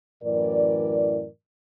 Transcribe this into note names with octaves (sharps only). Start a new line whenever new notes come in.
F#2 A2 E3 A#4 D5